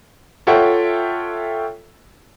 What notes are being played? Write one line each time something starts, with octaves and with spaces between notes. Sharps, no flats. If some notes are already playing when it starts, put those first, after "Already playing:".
F4 A4 C#5 E5 F#5 G5